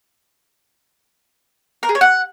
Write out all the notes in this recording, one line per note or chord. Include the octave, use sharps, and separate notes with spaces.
A#4
G#4
C#5
F#5